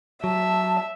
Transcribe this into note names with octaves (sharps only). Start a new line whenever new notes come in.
F#3 E5 A5